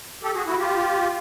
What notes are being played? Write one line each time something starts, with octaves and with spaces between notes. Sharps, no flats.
G4 A4
F#4 G#4
E4 F#4
F4 G4